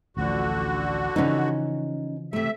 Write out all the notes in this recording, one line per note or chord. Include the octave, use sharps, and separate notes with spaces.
A1 D2 D3 F3 F#4
C#3 E3 F3 C#4 D#4
C3 A3 E5